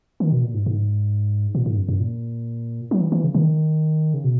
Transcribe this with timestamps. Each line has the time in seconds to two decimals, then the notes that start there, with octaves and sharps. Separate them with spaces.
0.20 D#3
0.32 B2
0.43 A#2
0.54 G#2
0.66 G#2
1.55 A#2
1.66 G#2
1.78 F#2
1.89 F#2
2.00 A#2
2.91 F#3
3.01 E3
3.12 E3
3.24 C#3
3.34 D#3
4.14 C#3
4.24 B2